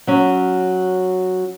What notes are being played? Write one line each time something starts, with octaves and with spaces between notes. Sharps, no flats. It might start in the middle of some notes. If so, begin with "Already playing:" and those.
F#3 C#4